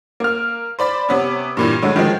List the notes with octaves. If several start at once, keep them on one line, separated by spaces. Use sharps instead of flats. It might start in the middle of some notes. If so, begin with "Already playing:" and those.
A#3 F6
C5 D5 B5
C3 B3 C#4
G2 A#2 E3
A2 D3 F#3 G#3
D#3 F3 G#3